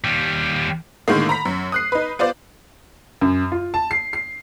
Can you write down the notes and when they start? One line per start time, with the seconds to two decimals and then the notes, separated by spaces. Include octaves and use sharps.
0.04 D#2 G3
1.08 A2 D3 D#3 G#3 A#3
1.29 A#5 B5 B6
1.45 F#2
1.72 D#6 F#6 C7
1.92 D#4 B4
2.19 B3 F4 C5 D5
3.21 F#2
3.52 F4
3.74 A5
3.91 C7
4.13 C7